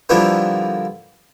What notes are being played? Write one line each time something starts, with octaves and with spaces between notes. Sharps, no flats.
D3 F3 G3 A#3 B3 E4